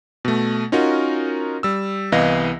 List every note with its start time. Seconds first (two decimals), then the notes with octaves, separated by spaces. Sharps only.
0.25 B2 A3
0.72 C#4 D#4 F4 F#4 A#4
1.63 G3 E6
2.12 C2 E3 B3 D#5 F5 A#6